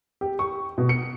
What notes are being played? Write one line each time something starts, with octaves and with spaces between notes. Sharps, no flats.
G4
C#6
B2
C#7